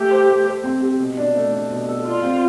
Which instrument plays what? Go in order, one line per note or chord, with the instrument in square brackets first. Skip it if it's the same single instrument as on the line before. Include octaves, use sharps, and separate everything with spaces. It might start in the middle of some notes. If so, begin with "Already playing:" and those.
Already playing: [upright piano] A3 [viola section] G4
[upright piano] C5
A3
C5
C4
G4
B2
D4
A3
D4
B2
A4
[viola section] F4 [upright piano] D5
[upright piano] C4